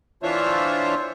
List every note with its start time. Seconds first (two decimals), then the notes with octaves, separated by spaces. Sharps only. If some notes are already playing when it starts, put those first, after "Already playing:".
0.23 E3 D4 F4 C5 C#5 E5